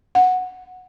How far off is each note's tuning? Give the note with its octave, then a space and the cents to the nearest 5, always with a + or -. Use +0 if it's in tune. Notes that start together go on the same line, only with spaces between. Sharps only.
F#5 -10